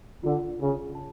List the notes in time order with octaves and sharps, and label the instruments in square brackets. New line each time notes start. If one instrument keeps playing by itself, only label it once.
[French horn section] D3 [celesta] F4
[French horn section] C#3 [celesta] F4
[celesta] A5